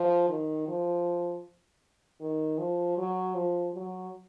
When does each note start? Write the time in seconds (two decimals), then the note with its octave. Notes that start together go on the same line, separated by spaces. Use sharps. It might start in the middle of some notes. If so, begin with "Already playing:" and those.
Already playing: F3
0.29 D#3
0.68 F3
2.21 D#3
2.58 F3
2.97 F#3
3.34 F3
3.74 F#3